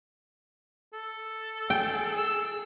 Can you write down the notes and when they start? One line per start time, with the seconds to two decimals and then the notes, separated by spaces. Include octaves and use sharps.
0.93 A4
1.70 G#4 G5
2.17 E6